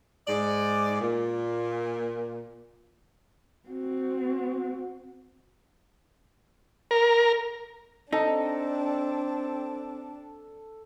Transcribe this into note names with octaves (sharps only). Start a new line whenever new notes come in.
G#2 D5
A#2
C4 F#4
A#4
C4 D4 D#4 A4